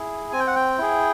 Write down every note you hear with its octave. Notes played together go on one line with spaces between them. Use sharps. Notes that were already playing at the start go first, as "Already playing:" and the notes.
Already playing: E4 G#4
C4 G#5
G5
F#5
G5
E4 G#4